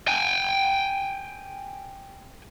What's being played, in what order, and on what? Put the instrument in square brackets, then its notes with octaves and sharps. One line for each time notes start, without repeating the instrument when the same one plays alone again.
[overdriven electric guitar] G5 G#5